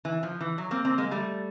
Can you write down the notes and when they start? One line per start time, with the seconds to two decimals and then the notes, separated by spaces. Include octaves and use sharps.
0.05 E3
0.23 F3
0.41 E3
0.58 F#3
0.71 A#3 C4
0.85 A#3 C4
0.98 G#3 A#3
1.11 G3 A3